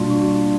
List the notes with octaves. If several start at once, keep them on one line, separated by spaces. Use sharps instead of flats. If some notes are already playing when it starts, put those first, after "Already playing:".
Already playing: B2 G3 A#3 D4 F4
F#4